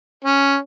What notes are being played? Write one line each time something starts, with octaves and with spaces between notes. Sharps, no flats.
C#4